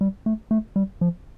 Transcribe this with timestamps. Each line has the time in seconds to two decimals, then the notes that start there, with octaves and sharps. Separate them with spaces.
0.01 G3
0.26 A3
0.51 A3
0.76 G3
1.01 F3